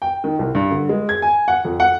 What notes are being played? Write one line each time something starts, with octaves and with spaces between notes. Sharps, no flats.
G5
D#3
C2
G2
D3
G#3
G#6
G#5
F#5
F2
F#5